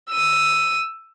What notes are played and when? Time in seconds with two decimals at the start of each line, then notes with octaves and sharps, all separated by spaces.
0.11 E6 D#7